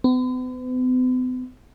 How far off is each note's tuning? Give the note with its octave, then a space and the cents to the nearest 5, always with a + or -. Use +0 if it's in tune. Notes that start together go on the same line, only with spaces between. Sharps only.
B3 +45